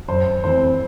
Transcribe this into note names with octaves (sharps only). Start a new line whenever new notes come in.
F#2 C5
E3 A3 C4 C5